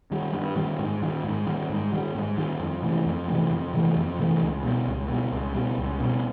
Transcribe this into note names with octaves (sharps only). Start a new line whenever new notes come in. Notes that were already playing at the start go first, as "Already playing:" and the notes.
D#3 G3
G2
D#3 G3
G#2
D#3 G3
G#2
D#3 G3
G#2
D#3 G3
G#2
D#3 G3
F2
C3 E3 A3
F2
C3 E3 A3
F2
C3 E3 A3
F2
C3 E3 A3
C#2
B2 G3
C#2
B2 G3
C#2
B2 G3
C#2
B2 G3